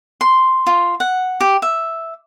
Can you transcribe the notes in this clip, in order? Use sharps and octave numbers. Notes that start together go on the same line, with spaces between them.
C6
F4
F#5
G4
E5